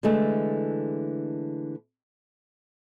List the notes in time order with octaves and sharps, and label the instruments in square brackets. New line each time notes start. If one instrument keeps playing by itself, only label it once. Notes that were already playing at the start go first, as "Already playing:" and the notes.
[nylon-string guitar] D3 E3 G#3 A3